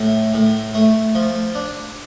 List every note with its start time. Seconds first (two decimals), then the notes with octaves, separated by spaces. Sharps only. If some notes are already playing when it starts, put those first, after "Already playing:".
Already playing: A2
0.34 A2
0.74 A3
1.15 F3
1.55 D4